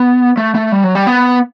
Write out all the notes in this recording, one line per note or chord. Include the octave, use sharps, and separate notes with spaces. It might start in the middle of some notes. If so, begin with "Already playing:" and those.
Already playing: B3
A3
A3
G3
F#3
G3
B3